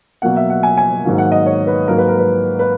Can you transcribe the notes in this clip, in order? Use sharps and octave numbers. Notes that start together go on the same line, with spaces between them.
B2 F#3 A#3 F#5
E5
F#5
G#5
G#5
G#2 D#3 F#3 A#3
F#5
D#5
C#5
B4
G#2 F#3 A#3 A#4
B4
A#4
B4
B4